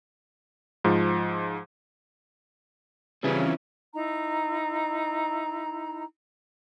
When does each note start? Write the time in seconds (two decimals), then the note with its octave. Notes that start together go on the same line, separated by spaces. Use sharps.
0.84 G#2 F3
3.23 C#3 E3 G3 C4 C#4 E4 F4
3.94 D#4 E4 A#5